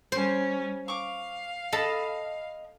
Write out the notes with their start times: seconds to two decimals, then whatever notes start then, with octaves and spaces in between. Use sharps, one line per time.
0.12 G3 C#4 C5
0.88 F5 C#6 D6
1.73 A4 D#5 A5 B5